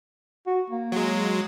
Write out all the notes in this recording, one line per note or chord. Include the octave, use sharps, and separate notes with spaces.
F#4
A#3
F#3 G#3